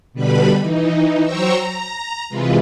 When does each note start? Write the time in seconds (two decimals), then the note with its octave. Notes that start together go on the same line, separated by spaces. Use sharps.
0.13 B2 D3 G3 B4 B5
0.60 E3 D#4
1.23 F#3 C5 G5 A#5 C#6 E6
1.55 A#5
2.29 C3 E3 G#3 F4 B4